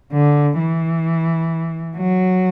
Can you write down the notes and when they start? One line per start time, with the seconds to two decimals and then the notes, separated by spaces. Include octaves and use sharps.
0.13 D3
0.59 E3
1.96 F#3